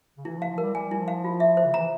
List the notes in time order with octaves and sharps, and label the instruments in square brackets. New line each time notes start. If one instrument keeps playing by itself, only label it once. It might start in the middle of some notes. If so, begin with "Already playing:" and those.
[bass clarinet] C#3
[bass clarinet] E3 [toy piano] E4
[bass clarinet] F3
[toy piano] F5
[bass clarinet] F3
[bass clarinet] G3 [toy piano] A#4
[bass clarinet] G3 [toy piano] G#5
[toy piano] E4
[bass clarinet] F3
[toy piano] F5
F4
E5
C5
[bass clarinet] C#3
[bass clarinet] E3 [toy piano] A#5